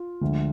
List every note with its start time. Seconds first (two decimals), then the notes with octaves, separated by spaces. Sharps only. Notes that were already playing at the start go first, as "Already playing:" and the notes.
Already playing: F4
0.21 D2 D3 F3 G#3